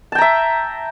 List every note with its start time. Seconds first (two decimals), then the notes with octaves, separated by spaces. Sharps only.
0.12 A5
0.15 G5
0.18 A#5
0.21 E5